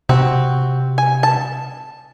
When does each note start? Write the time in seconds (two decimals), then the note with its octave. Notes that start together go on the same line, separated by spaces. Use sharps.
0.09 C3 C4 F#4
0.98 G#5
1.23 A5